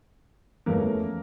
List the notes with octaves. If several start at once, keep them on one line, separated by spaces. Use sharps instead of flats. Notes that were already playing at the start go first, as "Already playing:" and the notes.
F1 E2 E3 A3 A#3 C#4 A#4